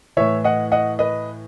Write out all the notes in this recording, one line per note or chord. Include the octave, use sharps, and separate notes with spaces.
A2 E3 C#5 E5
D#5 F#5
D#5 F#5
B4 D#5